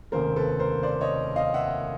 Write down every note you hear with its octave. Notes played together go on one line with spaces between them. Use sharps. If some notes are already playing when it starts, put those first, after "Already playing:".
F1 D#2 C#3 A#4 C5
A4 B4
A#4 C5
C5 D5
C#5 D#5
D#5 F5
E5 F#5